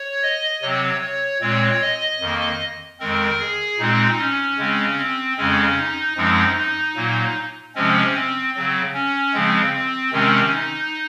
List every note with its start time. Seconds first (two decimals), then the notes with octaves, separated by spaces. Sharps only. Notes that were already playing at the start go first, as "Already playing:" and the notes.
Already playing: C#5
0.23 D#5
0.62 C3 F#3 C4 C#5
1.01 C#5
1.41 A#2 G#3 C4 C#5
1.81 D#5
2.21 F2 D#3 A#3
3.00 F2 D#3 G#3 C4 A#4
3.39 G#4
3.79 A#2 G#3 C4 D#4
4.19 C#4
4.58 C#3 G#3 C4
4.98 C4
5.37 F2 C#3 G#3 C4 C#4
5.78 D#4
6.17 F#2 F3 G#3 C4 D#4
6.56 D#4
6.96 A#2 F#3 A#3
7.75 C3 F3 G#3 C4 C#4
8.15 C4
8.54 C#3 F#3 C4
8.94 C#4
9.34 C#3 F3 G#3 C4
9.73 C4
10.12 C3 D#3 G#3 C4 C#4
10.52 D#4